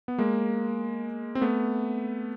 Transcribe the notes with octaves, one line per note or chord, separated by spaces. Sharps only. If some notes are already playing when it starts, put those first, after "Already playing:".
B3
G#3 A#3
C4
A3 B3